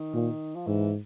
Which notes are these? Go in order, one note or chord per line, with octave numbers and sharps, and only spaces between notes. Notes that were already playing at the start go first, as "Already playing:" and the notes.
Already playing: D#3
A#2
F3
G#2 E3